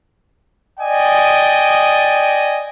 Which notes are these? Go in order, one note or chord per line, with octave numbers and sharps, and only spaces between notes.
D5 D#5 G5 G#5